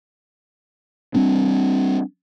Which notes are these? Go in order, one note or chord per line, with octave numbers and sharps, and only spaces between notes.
G3 C4 D4